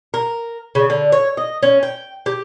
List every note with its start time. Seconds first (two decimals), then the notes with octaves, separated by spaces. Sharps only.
0.14 A#4
0.75 C#3
0.90 D3
1.12 C#5
1.37 D#5
1.63 C#4
1.83 G5
2.26 G4